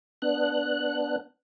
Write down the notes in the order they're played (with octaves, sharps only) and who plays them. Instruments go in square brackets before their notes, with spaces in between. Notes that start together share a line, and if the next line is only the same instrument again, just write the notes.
[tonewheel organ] B3 D4 F#6